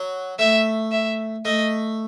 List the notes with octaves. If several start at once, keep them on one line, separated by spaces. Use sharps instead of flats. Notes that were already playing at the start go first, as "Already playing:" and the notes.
Already playing: F#3
A3 E5
E5
A3 D#5